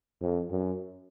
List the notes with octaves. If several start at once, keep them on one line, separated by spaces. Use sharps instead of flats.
F2
F#2